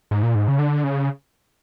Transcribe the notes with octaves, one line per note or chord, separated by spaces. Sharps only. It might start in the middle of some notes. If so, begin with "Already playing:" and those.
G#2
A#2
G#2
C#3
D3
C#3